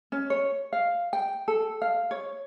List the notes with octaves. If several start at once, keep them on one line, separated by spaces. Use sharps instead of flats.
C#4
C#5
F5
G5
A4
F5
C#5